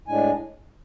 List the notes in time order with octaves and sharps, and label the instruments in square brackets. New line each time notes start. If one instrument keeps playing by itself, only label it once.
[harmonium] A2 G#3 D4 G#5